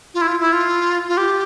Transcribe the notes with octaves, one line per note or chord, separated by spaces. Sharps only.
F4
E4
F4
E4
F4
F4
G4